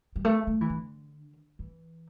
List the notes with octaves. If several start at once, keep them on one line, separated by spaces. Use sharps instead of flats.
G3
A3
A3
E3
D3
E3